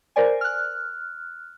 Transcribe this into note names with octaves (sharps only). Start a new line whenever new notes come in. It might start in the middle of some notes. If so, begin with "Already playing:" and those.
A#4 C5 D5 G#5
F6 F#6